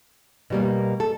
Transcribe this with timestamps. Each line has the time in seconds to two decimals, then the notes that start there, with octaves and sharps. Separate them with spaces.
0.50 B2 G3 A#3
1.00 A4